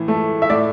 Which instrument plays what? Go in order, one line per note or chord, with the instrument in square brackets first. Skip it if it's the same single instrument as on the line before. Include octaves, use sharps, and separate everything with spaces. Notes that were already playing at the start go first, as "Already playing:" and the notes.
Already playing: [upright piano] A2 E3
A3
E5
A2 D5